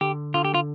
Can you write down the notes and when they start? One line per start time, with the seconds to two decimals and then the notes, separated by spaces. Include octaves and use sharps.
0.01 D3 G4
0.34 D3 F4
0.45 G4
0.54 F4